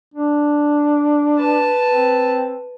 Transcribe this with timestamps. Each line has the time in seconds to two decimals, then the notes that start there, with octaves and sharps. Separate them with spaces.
0.15 D4
1.36 B4 A5
1.89 C4